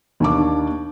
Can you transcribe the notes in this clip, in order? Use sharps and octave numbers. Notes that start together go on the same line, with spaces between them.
D#2 D4 D6